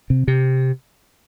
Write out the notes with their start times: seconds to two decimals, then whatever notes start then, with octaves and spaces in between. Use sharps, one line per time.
0.10 C3
0.28 C3